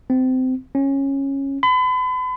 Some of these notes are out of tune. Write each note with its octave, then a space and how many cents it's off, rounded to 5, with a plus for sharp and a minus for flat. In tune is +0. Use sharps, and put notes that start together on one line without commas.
C4 -25
C#4 -15
B5 +40